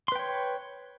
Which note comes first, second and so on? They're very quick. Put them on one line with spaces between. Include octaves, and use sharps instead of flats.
C6 B4 G5 C#5